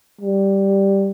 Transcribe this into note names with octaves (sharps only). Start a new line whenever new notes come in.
G3